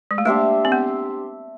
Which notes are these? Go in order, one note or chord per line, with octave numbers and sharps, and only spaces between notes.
G#3
A3
A#3 D4 G4 C5 E5
C4
B3